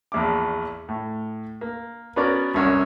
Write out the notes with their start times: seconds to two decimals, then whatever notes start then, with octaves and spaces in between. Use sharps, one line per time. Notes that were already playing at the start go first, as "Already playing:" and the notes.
0.12 A#1 E2 D6
0.89 A2
1.61 A#3
2.16 B3 C#4 F#4 A#4 D5
2.54 C2 F#2 C#4 A#4 F#5 E6